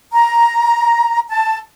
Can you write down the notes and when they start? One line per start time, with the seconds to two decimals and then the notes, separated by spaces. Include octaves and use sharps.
0.12 A#5
1.28 A5